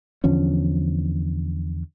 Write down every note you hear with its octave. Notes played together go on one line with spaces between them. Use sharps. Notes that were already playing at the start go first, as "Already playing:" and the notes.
E2 D3 F3 C#4